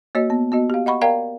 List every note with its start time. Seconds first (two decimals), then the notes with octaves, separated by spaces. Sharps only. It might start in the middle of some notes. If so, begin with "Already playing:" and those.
0.15 A#3 F#4 C#5 D#5
0.30 B3
0.52 B3 F#4 D#5
0.70 G4 F5
0.86 D#5 F#5 B5 C#6
1.01 A#4 D5 F5 G5 A#5